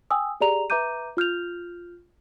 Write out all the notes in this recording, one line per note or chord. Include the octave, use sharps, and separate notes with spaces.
G5 G#5 D#6 E6
G4 G#4 D5 A#5 F7
B4 E5 A#5 D6 G6 D#7
F4 F6 G6 F7